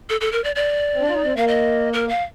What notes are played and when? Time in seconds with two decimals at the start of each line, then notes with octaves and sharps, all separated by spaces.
0.10 A4
0.21 A4
0.32 A#4
0.44 D5
0.55 D5
0.94 C4
1.01 D4
1.08 F4
1.14 D#4
1.24 C4
1.36 A#3 F5
1.48 D#5
1.93 A#4
2.09 F5